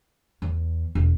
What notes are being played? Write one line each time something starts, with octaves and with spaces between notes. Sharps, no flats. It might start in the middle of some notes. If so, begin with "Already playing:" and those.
E2
E1